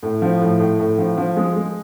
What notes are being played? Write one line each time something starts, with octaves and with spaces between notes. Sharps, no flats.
A2
F3
A2
A2
A2
F3
F3
G#3
G#3